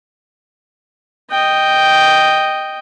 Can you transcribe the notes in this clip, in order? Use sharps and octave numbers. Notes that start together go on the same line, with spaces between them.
D#5 G5